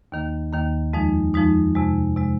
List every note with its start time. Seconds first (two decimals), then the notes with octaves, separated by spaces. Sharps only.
0.12 D#2 D#3 A#3
0.53 D#2 D#3 A#3
0.93 F2 F3 G#3 D#4
1.34 F2 F3 G#3 D#4
1.75 F2 C3 G#3
2.16 C3 G#3